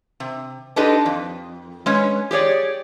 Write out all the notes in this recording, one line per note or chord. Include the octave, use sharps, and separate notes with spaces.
C3
D4 D#4 G4 A4 B4 D#5
F2
G#3 C#4 B4 C#5
G4 G#4 C#5 D5